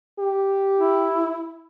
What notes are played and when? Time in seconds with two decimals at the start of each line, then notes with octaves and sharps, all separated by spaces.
0.19 G4
0.77 E4